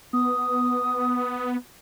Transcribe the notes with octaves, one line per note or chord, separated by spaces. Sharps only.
B3 D#6